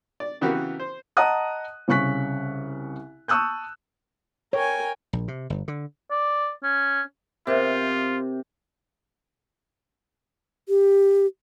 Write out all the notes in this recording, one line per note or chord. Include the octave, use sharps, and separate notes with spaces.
D5
C#3 E3 B3 F#4 G4 A#4
C5
D#5 F#5 A5 A#5 D#6 F#6
C2 C#3 C#6 F#6 B6
A5 C#6 D#6 E6 F#6 G6
A#4 C#5 G5 G#5
A#1
C3
G1
D3
D5
C#4
C3 F4 A#4 C5 E5
G4